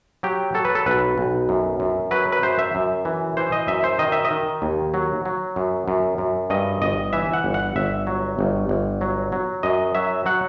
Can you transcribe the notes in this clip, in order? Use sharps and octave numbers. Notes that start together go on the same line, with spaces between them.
F#3 G4
F#3 A4
B4
A4
B1 B4
B1
F#2
F#2
F#3 B4
B4
F#2 C5
E5
F#2
E3
E3 C5
D#5
F#2 E5
C5
D#3 D#5
E5
D#5
D#3
D#2
F#3
F#3
F#2
F#2
F#2
G2 D#5
G1 D#5
E3 E5
F#5
G1
F#5
G1 E5
F#3
G1
G1
F#3
F#3
F#2 D#5
F#3 E5
F#3 F#5